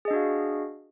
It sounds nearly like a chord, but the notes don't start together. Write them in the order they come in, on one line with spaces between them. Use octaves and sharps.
G#4 D#5 D4 F#4 F5